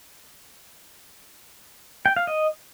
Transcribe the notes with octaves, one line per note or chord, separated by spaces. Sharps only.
G5
F5
D#5